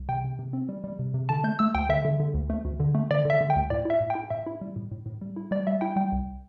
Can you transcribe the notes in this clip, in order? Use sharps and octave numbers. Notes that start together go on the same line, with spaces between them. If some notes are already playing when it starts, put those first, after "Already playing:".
Already playing: C2
C3 G5
C3
C3
C4
G3
G3
C3
C3
D3 A5
A3 G6
A3 E6
D2 G5
D3 E5
D3
D3
D2
A3
D2
D3
A3
D3 D5
D3 E5
D3
G5
D2
A2 D5
E4 E5
A2
G5
E4
A2 E5
E4
G3
A2
A2
A2
G3
E4
G3 D5
G3 E5
E4 G5
G3 G5
C2